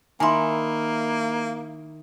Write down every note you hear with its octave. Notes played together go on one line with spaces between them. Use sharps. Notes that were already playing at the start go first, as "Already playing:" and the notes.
D#3 A#3 E4 G#5 A#5 C6